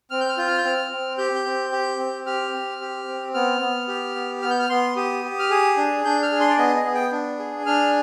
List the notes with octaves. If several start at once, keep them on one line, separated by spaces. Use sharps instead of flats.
C4 F6
G6
F6
F4 G6
F6
G6
C4 F6
C4
G4 G6
G6
C4
G4
C4
G4 F6
C4
G4
C4
B3 F6
B3
G4
B3
B3 F6
G6
F6
B3 C6
G4 D#6
G4
F6
G#4 D#6
D4
D4 G6
F6
G#4
C6
D5
B3 D#5
D#5
B3
G5
D4
G#4
D4 F6